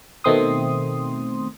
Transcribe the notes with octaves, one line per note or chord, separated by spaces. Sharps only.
B2 D#3 A3 C4 C6 D#6